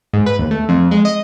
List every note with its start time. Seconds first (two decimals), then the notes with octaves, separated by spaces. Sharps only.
0.13 G#2
0.26 B4
0.39 D#2
0.51 A3
0.69 F2
0.91 G#3
1.05 D#5